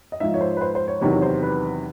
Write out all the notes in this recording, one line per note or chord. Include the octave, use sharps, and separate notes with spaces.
D#5
G#2 F3 E5
C#5
C5
B4
C5
C5
C#5
E2 C3 D#3 F#3 C#5
C5
B4